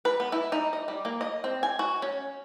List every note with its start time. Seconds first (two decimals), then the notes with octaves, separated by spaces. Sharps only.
0.05 B4
0.20 B3
0.32 E4
0.52 D#4
0.73 D#5
0.88 G3
1.05 A#3
1.21 D#5
1.44 C4
1.63 G#5
1.79 F#4
2.02 C#4